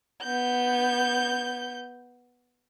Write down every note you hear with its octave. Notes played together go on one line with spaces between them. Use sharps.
B3 G6